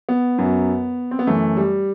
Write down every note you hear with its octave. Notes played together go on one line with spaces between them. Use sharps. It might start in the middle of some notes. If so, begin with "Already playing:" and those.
B3
F#2 F#3
C4
B3
F#2 E3 A3
G3